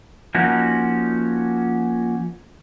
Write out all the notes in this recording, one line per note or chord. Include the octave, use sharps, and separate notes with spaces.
F3 A#3 C#4 D#4 F#4